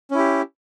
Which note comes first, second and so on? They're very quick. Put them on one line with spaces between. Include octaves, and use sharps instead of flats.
C#4 E4 G4